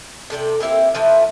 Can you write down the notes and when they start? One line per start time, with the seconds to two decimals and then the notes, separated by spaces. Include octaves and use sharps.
0.30 C3 A4 D5 G5
0.60 A#3 C4 E4 G4
0.95 E3 F3 A3